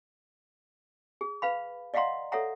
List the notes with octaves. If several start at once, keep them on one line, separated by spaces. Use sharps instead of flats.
G#4
B4 F5 B5
D5 D#5 F5 F#5 A#5 C6
A4 C#5 E5 F#5 A#5